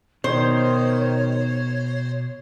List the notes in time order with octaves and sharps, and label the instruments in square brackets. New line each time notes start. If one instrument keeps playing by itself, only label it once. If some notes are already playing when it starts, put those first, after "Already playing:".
[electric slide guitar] B2 [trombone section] D#3 [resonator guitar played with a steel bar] C5 [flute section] C#5